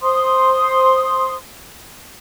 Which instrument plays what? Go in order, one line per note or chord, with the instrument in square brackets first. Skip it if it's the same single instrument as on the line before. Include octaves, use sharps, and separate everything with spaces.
[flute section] C5 C6 D#6